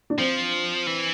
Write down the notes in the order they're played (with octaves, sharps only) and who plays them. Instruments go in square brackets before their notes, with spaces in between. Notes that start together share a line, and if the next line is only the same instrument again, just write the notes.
[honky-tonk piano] D4
[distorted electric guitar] F3 [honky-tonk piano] C4
[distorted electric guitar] E3